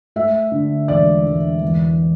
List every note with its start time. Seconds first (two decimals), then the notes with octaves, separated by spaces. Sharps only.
0.16 A3 E5
0.52 D3
0.88 E1 D5
1.26 E1
1.62 E2